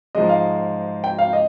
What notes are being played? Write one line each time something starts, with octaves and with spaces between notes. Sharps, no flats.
G#2 F3 G#3 D#5
F5
G5
F5
D#5